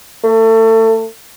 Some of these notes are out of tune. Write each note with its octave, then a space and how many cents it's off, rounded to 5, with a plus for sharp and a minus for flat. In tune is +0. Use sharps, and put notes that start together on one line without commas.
A3 +30